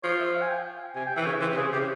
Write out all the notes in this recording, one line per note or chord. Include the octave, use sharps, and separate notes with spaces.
F3 C#5
E5
F5
G#5
G5
C3 G#5
G5
E3 E5
C#3 C#5
E3 C5
C3
C#3 G#4
C3 G4
C#3